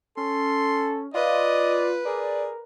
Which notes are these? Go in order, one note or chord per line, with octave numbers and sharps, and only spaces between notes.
C#4 A4 C6
F4 B4 D5 D#5
G#4 A#4 D5